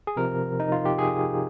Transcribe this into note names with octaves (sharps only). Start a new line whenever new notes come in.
G#4
C3 F3 A#4
D#4
F4
G4
G#4